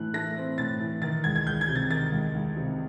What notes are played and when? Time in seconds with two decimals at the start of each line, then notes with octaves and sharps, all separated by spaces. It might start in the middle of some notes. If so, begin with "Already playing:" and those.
Already playing: A2 E3 A3 F#6
0.14 A3 A#6
0.37 C4
0.58 A2 A6
0.80 E3
1.02 D#3 A6
1.24 C#2 G#6
1.36 G#6
1.46 C#2 G6
1.61 G#6
1.68 C3
1.75 A6
1.90 D#3 A6
2.12 C#2
2.34 C#2
2.56 C3